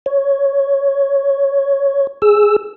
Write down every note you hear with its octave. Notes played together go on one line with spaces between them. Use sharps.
C#5
G#4 E6